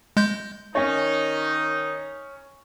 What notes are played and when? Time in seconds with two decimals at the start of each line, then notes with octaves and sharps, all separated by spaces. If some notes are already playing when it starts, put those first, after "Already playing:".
0.17 G#3 G6
0.75 D#3 C#4 D#4 C#5